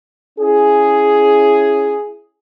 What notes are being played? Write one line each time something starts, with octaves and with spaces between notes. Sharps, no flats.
C#4 E4 G#4